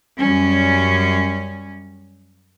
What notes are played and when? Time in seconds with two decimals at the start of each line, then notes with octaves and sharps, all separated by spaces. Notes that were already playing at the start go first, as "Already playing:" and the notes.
0.18 F#2 G3 C#4